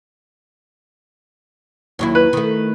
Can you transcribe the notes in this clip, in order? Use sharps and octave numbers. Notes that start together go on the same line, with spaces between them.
D#2 F#3 E4
B4
D#3 A3